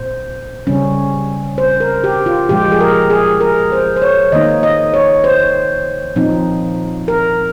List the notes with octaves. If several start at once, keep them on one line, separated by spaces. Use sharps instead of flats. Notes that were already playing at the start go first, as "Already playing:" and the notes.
Already playing: A#2 C5
C#3 G3 C#4
C5
A#4
G4
F4
A#2 F3 G#3 G4
G#4
A#4
G#4
A#4
C5
C5
C#5
D#3 A#3 D#4 D#5
D#5
C#5
C5
A#2 F3 C4 D#4
A#4